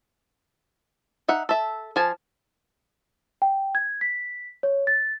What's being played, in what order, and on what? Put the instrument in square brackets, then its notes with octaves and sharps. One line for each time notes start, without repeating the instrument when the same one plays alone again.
[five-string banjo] D#4 E5 F#5
A4 E5
F3 G#5 A5
[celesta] G5
G#6
B6
C#5
A6